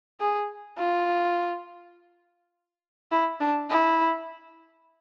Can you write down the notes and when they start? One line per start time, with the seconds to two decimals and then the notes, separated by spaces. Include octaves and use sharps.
0.20 G#4
0.78 F4
3.12 E4
3.40 D4
3.70 E4